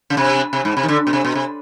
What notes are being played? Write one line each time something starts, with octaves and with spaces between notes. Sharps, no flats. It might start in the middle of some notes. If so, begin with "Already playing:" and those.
C#3
C3
C3
G#2
C3
D#3
D3
B2
C3
B2
C3